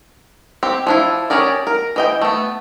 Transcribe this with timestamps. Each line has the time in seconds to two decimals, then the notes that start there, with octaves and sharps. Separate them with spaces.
0.63 C4 G4
0.87 F3 D4 E4
1.30 C#4 G4 G#4 A#4 D5
1.67 A#4
1.96 E3 D#5 G5
2.22 A3 B3